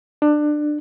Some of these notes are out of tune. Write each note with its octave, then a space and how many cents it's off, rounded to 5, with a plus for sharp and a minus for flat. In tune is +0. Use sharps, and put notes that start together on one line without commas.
D4 +20